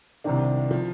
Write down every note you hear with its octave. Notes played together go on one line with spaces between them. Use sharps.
C2 C3 D#3 D4
F3